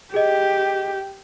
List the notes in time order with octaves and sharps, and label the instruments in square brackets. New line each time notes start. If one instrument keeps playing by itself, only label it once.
[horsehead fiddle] G4 [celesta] G#4 D#5